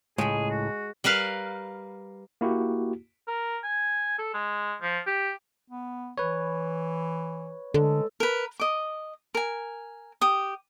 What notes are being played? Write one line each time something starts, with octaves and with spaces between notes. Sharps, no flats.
C#2 A2 G#3 G#4 B5
F#4
G3 A#4 B4 F5
A#3 E4 F#4 G4
A#4
G#5
A4
G#3
F3
G4
B3
E3 B4 C#5
D3 G#3 A4
A#4 B4
D#5 D6
A#4 G#5
G4 D#6